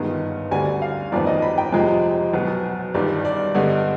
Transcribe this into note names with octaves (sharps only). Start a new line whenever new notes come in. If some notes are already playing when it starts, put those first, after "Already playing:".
Already playing: G1 G2 D#3 G#3 B3
D2 D3 G3 G#5
F5
F1 F2 D#3 B3 D5
D#5
B5
G5
F1 F2 C3 F3 G#3
B1 B2 B3
G1 G2 D#3 G3 D5
D5
G2 D3 G#3 B3